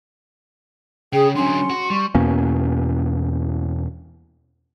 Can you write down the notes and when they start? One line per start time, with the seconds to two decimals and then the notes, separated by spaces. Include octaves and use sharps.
1.13 C#3 G#4 G5
1.35 D3 F#3 C#4 C6
1.70 F#4
1.90 G3 C#6
2.15 E2 B2 A#3 C#4